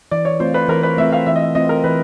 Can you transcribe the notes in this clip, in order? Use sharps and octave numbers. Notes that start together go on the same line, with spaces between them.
E3 D5
C#5
A3 C4 F4 C5
B4
E3 A#4
B4
A3 C4 F4 E5
F5
E3 E5
D#5
E5
A3 C4 F4 D#5
A#4
E3 B4